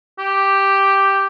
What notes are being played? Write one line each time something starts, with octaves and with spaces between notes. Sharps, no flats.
G4